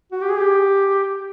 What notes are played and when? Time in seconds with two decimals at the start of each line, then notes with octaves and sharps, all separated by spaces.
0.12 F#4
0.21 G4
0.30 G#4
0.40 G4